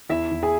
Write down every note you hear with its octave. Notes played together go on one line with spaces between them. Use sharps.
E2 E4 E5
E2
G#4 G#5